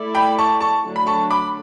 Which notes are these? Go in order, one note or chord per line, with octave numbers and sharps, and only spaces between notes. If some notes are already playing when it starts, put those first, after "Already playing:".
Already playing: A3 E4 A4 D5
G5 B5
A5 C#6
A5 C#6
D3 F#3 A3 D4
B5
A5 C#6
B5 D6